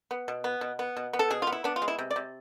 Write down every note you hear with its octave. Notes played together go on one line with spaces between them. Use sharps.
B3
B2
B3
B2
B3
B2
B3
A4
B2 G#4
F4
B3
E4
B3 D4
F4
G#3
E4
C3
D5
C3